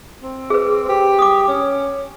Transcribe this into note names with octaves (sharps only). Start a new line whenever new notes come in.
C4
G#4 B4
G4
D6 D#6
C#4